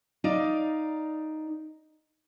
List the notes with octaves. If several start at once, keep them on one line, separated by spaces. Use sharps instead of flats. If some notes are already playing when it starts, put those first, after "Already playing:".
D#4 D5 F5